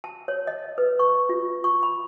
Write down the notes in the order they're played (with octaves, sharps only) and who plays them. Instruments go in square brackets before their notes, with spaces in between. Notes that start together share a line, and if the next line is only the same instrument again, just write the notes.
[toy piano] A5
C#5
D#5
B4
C#6
F4
C#6
B5